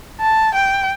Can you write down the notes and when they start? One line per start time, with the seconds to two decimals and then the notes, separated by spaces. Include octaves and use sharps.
0.21 A5
0.55 G5